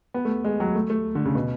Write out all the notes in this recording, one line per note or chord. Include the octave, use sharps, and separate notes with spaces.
B3
A3
G#3
F#3
A3
A3
D3
C#3
B2